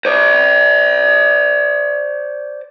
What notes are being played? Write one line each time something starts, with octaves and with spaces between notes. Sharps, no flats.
C5 D5